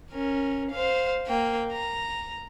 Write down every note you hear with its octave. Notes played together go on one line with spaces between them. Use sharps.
C#4 A#4
C5 F5
A#3 G5
A#5